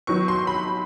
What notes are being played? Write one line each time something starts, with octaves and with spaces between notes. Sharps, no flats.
D#3 F#3 B3 C#6
C6
B5